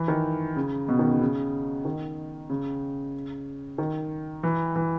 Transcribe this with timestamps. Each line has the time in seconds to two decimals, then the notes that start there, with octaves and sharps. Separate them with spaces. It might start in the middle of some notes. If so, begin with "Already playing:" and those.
Already playing: E3
0.08 D#3
0.56 C#3
0.88 B2
0.99 D#3
1.10 C#3
1.21 C#3
1.85 D#3
2.50 C#3
3.78 D#3
4.43 E3
4.76 E3